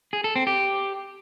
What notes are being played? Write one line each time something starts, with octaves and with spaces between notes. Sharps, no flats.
G#4
A4
C4
G4